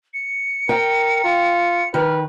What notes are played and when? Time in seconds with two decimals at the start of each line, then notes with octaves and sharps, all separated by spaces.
0.14 C#7
0.69 A#4 G5
1.24 F4
1.94 D#3 B4 F6